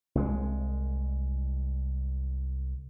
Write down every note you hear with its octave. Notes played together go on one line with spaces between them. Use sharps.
C2 G#3